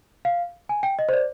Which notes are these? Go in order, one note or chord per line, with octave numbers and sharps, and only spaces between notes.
F5
G#5
G5
D#5
C5
D5